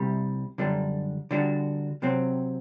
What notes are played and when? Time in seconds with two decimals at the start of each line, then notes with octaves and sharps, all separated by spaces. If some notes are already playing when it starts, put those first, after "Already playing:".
Already playing: C2 C3 G3
0.58 F#2 D3 G3 D4
1.31 D3 G3 D4 F#4
2.02 C3 F#3 C4